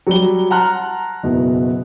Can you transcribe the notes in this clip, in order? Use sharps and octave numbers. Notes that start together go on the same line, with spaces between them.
F#3 G3 G7
F#5 A5 A#5 C6 F6 F#6
F#1 B2